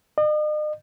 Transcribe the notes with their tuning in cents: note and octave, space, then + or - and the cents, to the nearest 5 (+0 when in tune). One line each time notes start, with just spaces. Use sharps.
D#5 -45